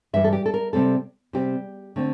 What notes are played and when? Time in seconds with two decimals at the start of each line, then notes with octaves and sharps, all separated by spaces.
0.13 G2 E3 G3 E5
0.24 A4
0.33 G4
0.46 A4
0.54 A#4
0.73 C3 G3 C4 A4
1.33 C3 G3 C4 G4
1.96 D3 A3 C4